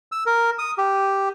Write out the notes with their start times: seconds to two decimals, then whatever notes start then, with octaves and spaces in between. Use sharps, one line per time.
0.12 E6
0.26 A#4
0.59 D#6
0.78 G4